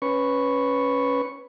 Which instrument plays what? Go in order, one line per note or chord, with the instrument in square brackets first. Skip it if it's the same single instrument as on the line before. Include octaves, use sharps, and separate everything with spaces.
[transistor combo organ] C#4 B4 C#6